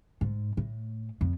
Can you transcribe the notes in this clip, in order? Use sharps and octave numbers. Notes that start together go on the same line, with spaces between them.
G#2
A2
F2